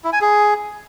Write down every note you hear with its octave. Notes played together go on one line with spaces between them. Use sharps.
E4
G#5
G#4